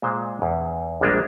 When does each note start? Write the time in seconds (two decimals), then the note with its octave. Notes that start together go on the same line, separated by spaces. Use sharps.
0.02 A#2 G#3 C5
0.42 E2
1.01 A#1 G3 G#3 A#3 D4